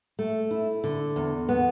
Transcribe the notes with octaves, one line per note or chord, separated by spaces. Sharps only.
A3
E4
D3
E2
B3